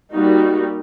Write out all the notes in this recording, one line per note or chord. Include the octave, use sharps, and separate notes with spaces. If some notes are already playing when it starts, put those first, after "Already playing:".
G3 A#3 D#4 F#4